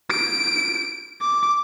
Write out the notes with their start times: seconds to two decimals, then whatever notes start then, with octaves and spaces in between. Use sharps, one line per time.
0.10 D7
1.21 D6